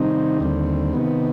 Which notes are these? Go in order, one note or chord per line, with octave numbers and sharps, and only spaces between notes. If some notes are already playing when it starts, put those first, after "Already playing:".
Already playing: C3 D#3 G3 C4 D#4
D#2 D3 G3 C4
C3 D#3 B3